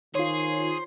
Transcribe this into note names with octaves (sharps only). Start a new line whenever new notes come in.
D#3 F4 G#4 C5 C#5